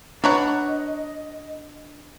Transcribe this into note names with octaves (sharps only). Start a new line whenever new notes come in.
B3 D4 C#5 D#5 F#5 A#5